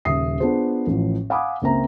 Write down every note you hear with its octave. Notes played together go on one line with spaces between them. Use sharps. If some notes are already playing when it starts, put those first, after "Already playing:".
D#1 C#3 E5 D#6 C7
B3 D4 F4 G#4 C5
A1 A2 F3
F5 F#5 G#5 B5 D6 D#6
C#2 A#3 C4 C5 E5 A#5